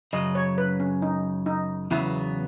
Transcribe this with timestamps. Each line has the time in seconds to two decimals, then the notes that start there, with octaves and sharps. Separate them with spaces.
0.13 F#2 C#3 F#3 D#5
0.35 C#5
0.58 B4
0.80 C#4
1.02 D#4
1.46 D#4
1.91 E2 C#3 F#3 B3 E4